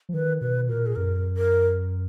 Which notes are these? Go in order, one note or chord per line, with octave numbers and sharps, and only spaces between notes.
F3
D#3 B4
B2 B4
A#2 A#4
G#4
F#2 A#4
A#4